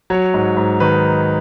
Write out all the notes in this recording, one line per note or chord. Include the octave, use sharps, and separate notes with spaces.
F#3 C#5
G#2
G#2
D#3 B4